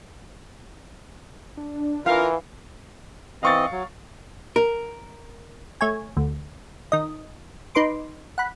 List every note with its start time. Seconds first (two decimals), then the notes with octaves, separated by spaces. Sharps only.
1.57 D4
2.06 E3 F4 A#4 F5
3.43 E3 C4 D#5 F5 C#6 A6
3.72 F#3
4.56 A#4
5.81 A3 C#5 G#5
6.17 D2
6.92 D#3 D#5
7.75 D#4 B4 C6 D6
8.38 F#5 B5